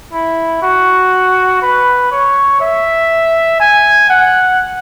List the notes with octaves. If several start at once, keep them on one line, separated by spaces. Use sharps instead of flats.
E4
F#4
B4
C#5
E5
G#5
F#5